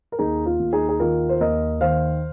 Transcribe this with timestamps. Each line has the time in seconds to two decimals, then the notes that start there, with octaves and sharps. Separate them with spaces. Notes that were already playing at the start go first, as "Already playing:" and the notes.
0.12 A#4
0.19 D#2 D#4 G#4
0.46 F4
0.59 D#2
0.73 D#4 G#4
0.89 G#4
1.00 D#3 F4 A#4
1.29 C5
1.40 D#2 A#4 D#5
1.81 D#3 C5 F5